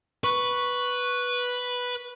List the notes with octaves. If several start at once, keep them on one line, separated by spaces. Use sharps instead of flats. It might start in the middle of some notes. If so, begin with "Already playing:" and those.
B4 C#6